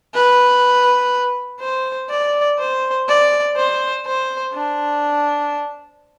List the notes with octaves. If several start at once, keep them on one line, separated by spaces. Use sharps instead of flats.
B4
C5
D5
C5
D5
C5
C5
D4